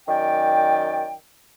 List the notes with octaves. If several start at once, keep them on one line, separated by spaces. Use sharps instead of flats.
F#2 D#3 D5 G5